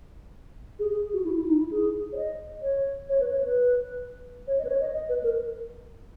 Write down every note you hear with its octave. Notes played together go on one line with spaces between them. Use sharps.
G#4
G#4
F#4
E4
E4
D#4
E4
G#4
C#5
D#5
C#5
C#5
B4
C#5
B4
C#5
D#5
B4
C#5
D#5
D#5
B4
A#4